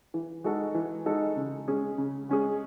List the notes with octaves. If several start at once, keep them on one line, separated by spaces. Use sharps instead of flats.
E3
G#3 D#4 F#4 A4
E3
G#3 D#4 F#4 A4
C#3
G#3 C#4 G#4
C#3
G#3 C#4 G#4